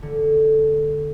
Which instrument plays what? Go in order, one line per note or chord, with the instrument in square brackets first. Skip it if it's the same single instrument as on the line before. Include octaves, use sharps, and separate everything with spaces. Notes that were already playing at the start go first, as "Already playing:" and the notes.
[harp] D3